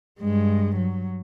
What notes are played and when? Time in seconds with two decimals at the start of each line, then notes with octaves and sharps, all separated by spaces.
0.21 G2 G#3
0.76 F#3